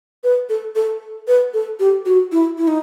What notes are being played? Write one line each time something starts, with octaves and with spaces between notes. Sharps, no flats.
B4
A4
A4
B4
A4
G4
F#4
E4
E4
D#4